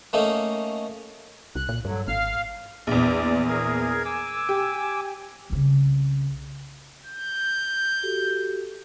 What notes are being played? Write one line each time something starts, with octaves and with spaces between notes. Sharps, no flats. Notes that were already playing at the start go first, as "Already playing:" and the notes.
A3 A#3 C#4 D#4
C2 F#6
A#2
G2 D3 F#3
G#1 F5 F6
A#1 E2 D5
G#4 A#4 G#6
G#5 D6 E6
G4
C2 C#3
G6
F#4 G4 A4